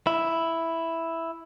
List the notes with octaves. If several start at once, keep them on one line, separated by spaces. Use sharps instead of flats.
E4